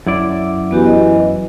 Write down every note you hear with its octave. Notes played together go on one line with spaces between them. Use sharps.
F#2 E4 D5
E3 B3 F#4 G4
D#5